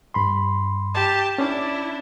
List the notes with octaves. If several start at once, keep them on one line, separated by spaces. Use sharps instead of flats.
G2 B5 C6
G4 A5
C#4 D4 E4